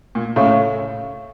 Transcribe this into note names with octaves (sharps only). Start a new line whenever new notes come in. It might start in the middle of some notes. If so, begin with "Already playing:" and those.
A#2
A2 C#3 A4 C#5 F5 C#6